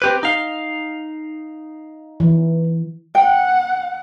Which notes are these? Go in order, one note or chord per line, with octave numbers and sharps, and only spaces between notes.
C4 G4 B4
D#4 F5
E3
F#5 G5